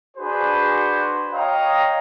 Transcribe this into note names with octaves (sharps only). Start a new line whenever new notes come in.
D4 F#4 G#4 B4 C5
C#5 D#5 F5 G5 A#5